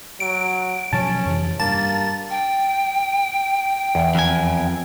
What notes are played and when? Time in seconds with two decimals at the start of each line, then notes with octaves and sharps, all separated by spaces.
0.20 F#3 D7
0.93 B2 F3 F#3 C#4 A5
1.25 F2 C3 E3
1.60 G2 A#3 A5 A6
2.30 G5
3.95 E2
4.15 F2 G#5